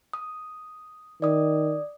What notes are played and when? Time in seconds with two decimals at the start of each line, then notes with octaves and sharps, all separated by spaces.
0.13 D#6
1.22 D#3 D5 D#6